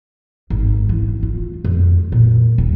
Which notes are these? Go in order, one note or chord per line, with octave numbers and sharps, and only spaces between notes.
G#1
E3
F4
F2
A#2
D#1